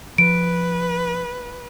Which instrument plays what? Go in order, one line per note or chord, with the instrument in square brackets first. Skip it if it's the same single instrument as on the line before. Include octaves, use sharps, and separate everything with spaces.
[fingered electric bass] F3 [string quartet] B4 [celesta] D7